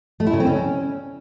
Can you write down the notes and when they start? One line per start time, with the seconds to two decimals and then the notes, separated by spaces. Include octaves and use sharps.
0.20 A3
0.27 E4
0.33 C#3
0.40 C4
0.47 C#4